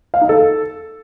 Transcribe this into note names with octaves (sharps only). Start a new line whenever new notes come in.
F5
D#4
A4